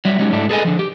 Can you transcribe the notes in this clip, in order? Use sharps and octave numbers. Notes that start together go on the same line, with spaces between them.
F#3 G3 E5
F#3 G#3 C#4 D#4 G4
G#2 A3 D4 E4
G#4 A4 B4 D#5 G#5
D3 F3
G4